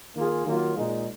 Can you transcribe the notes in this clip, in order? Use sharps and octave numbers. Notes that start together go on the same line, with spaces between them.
D#3 A#3 F4 G#4
D#3 F#3 A#3 F4
A#2 G#3 D#4